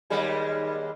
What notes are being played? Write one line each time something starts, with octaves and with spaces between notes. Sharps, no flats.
D#2 G3 G#3